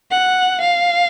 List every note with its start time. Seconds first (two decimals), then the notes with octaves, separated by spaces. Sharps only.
0.11 F#5
0.61 F5